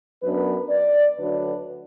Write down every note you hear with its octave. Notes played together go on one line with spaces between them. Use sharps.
F#2 F#3 B3 D4 B4
D5
D2 D3 F#3 D4 B4